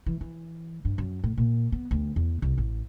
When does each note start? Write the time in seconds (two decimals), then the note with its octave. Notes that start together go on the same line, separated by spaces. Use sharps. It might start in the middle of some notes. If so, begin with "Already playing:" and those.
0.06 E3
0.21 E3
0.85 G2
0.98 F#2
1.24 A2
1.37 A#2
1.72 B3
1.91 D2
2.16 E2
2.42 C2
2.58 A1